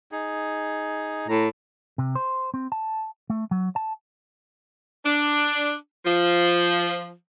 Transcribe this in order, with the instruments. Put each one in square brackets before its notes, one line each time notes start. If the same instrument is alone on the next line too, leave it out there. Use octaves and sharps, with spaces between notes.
[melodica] D#4 G#4
[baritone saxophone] A2 [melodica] A#5
[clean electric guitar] C3
C5
C4
A5
A3
F#3
A5
[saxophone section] D4
F3